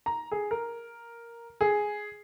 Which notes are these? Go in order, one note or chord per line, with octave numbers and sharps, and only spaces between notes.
A#5
G#4
A#4
G#4